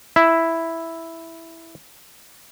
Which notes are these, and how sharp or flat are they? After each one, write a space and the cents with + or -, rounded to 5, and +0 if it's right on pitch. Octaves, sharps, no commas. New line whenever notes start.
E4 +0 E5 +0